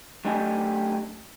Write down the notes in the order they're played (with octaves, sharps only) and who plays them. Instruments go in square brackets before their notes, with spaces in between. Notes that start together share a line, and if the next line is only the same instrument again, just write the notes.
[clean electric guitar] F#2 A3 D4 G4 D#5 G#5